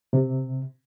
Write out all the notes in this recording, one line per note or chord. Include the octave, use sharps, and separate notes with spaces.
C3